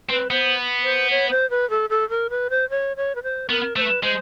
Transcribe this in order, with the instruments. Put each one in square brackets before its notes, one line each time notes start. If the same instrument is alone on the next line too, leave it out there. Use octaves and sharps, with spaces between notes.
[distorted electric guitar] C4 [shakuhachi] B4
[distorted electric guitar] B3 [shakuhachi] C5
[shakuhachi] C5
C#5
C5
B4
A4
A4
A#4
B4
C5
C#5
C#5
B4
C5
[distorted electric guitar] B3 [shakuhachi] A#4
[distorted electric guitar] A3 [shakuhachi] C5
[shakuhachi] B4
[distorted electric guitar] G#3 [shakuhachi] C5